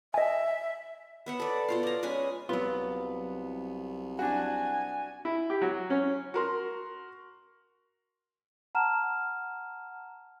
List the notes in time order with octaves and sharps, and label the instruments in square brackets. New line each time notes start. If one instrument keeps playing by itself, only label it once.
[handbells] D#5 G#5 [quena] E5
[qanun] B3 E5 F#5
A4 D5
B2 F4 F5
D5 A#5
G#3 C#4 B4 G#5
[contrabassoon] C2 [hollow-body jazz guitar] F#3 F4 [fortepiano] B3
[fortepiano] D4 F#4 [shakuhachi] G#5
[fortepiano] E4
G4
F#3
C#4
[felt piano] F#4 A#4 C6
[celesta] F#5 A5 A#5 F6 E7